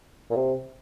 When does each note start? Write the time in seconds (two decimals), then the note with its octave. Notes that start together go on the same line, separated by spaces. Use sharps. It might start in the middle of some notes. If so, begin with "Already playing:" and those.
0.30 A#2
0.36 C3